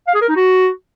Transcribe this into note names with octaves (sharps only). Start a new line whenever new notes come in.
F5
G#4
A#4
D#4
F#4